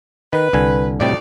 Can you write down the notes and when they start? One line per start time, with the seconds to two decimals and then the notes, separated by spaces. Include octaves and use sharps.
0.33 D#3 B4
0.53 C2 D3 G#5
1.00 D2 A2 C3 G3 D#4 D5